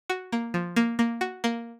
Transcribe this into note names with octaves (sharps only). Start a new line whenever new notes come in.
F#4
A#3
F3
A#3
A#3
F#4
A#3